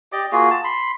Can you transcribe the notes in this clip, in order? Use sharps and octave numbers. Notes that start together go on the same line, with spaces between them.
G4 D5 D#5 D6
A#3 F4 F#4 G#4
A5
B5 C6